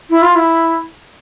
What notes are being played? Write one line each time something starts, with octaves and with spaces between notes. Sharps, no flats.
E4
F4
E4